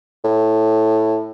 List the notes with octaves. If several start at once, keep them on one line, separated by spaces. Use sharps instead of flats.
A2